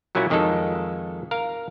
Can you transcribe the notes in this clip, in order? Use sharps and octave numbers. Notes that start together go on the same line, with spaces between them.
A#2 F#3 A#3 C#4 E4 F#4
F2 D#3 G#3 D#4 A4
A#4 F5